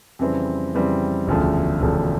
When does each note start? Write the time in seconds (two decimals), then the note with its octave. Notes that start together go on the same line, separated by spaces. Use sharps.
0.19 F2 C#3 E3 G3 C4
0.74 F2 C#3 E3 G3 C4
1.28 E1 D2 C#3 F3 A3
1.82 E1 D2 C#3 F3 A3